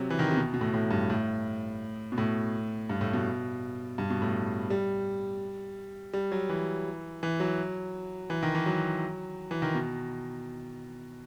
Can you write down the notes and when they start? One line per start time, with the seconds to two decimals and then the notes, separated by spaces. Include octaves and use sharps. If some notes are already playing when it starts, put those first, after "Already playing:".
Already playing: C3 F#3
0.10 E3
0.19 D#3
0.29 C3
0.37 B2
0.54 B2
0.61 A2
0.74 A2
0.91 G2
1.10 A2
2.12 B2
2.18 A2
2.90 G2
3.01 A2
3.13 B2
3.98 G2
4.10 B2
4.22 A2
4.70 G3
6.13 G3
6.32 F#3
6.49 E3
7.23 E3
7.40 F#3
8.30 E3
8.42 D#3
8.55 E3
8.66 F#3
9.51 E3
9.62 D#3
9.75 B2